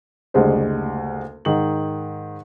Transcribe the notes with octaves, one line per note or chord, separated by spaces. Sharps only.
F#1 D2 G3 G#3 C5
G#2 D#3 F#7